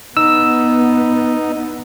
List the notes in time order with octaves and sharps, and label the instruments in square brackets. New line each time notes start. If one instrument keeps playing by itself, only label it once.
[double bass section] B3 [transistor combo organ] D#4 [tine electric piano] E6